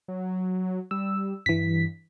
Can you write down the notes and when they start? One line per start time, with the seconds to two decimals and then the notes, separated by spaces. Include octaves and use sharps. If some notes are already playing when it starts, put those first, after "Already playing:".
0.08 F#3
0.91 G3 E6
1.46 G2 E3 B6